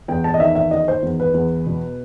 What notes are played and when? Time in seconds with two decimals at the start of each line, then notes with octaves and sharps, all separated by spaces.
0.08 E2 G5
0.24 A5
0.34 D#5
0.40 D#3 E5
0.55 E5
0.71 D#3 D#5
0.88 C5
1.03 E2
1.20 B4
1.34 E2
1.67 B2